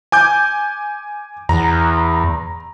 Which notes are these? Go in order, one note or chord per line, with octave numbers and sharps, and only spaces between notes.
G#5 D6 G6
E2 A#5